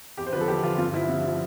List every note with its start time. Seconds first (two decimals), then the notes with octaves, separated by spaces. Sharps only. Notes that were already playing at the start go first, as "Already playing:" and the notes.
0.17 E2 G4
0.26 C5
0.33 D3 F3 B4
0.41 A4
0.48 E2 G4
0.63 D3 F4
0.67 F3
0.78 G2 F4
0.93 D3 F3 E4
1.09 G2
1.24 D3 F3